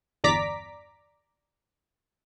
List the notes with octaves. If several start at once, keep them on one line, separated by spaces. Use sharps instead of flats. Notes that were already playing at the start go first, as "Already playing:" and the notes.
G1 E2 D5 A#5 D6 B6